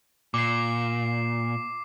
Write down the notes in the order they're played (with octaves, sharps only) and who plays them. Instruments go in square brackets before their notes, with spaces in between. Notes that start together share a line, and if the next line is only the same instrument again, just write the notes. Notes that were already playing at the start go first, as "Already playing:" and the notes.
[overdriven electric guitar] A#2 [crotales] D6 C7